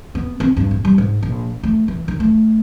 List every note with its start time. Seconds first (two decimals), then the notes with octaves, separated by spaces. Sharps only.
0.15 B3
0.40 C4
0.57 G2
0.71 A#1
0.85 G3
0.98 G#2
1.23 A#1
1.63 A3
1.88 E3
2.08 D#3
2.20 A3